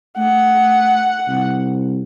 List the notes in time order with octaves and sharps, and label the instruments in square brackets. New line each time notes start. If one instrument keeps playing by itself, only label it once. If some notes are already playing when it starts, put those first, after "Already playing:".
[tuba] A3 [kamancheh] F#5
[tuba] C2